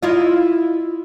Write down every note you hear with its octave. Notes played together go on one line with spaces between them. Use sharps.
E4 F4 D#5